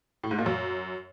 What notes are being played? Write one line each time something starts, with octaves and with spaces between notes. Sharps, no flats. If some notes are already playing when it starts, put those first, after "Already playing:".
A2
G#2
A#2
F#2